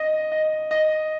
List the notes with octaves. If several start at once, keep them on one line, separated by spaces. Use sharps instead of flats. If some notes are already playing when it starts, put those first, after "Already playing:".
Already playing: D#5
D#5
D#5